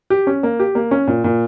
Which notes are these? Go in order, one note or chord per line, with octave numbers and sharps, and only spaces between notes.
G4
C#4
A#3
G4
A#3
C#4
A#2
A#2